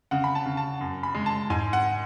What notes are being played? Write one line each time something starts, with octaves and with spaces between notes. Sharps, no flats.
C#3 F#5
B5
A5
C#3
A5
F#2
B5
G#3
A5
G#2 G#5
F#5